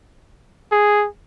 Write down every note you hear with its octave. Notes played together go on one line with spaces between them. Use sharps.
G#4